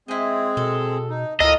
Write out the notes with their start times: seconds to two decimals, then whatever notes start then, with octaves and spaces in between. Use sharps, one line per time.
0.08 G#3 C4 E4 G#4 D#5
0.57 B2 A4
1.10 D#4
1.40 D2 A2 A#3 F4 D#5 A5 A#5 E6